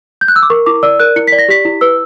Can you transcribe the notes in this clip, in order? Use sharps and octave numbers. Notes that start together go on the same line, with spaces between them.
G6
F#6
E6
D6
A#4 C#6
E4 D6
D5 E6
A#4 F#6
E4 C#7
D5 B6
A#6
G4 B6
E4
B4 E6